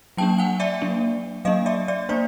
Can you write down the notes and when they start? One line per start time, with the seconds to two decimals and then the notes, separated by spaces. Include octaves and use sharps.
0.17 F#3 A#3 D4 G5 A5
0.38 F#5 G#5
0.60 D5 E5
0.82 F#3 A#3 D4
1.45 F#3 A#3 D4 D#5 F5
1.66 D5 E5
1.88 D5 E5
2.09 A#3 D4 C5 D5